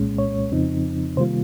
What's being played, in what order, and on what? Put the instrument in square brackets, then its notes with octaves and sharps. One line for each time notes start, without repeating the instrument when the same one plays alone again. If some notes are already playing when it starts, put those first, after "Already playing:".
Already playing: [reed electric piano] C2 A#2 G#3 C#4
C#5
F2 C#3 F3 C4 D#4
C3 D#3 G3 A#3 F4 C5